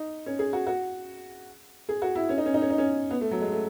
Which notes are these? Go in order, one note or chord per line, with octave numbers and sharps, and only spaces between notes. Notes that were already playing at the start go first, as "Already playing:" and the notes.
Already playing: D#4
C#4
G#4
F#4
F#4
G#4
F#4
E4
C#4
D#4
C#4
D#4
C#4
D#4
C#4
B3
A3
F#3
G#3
A3